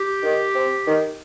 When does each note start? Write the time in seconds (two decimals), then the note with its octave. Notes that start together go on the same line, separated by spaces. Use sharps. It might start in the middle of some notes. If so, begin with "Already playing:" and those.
Already playing: G4
0.23 D#3
0.55 C3
0.86 D#3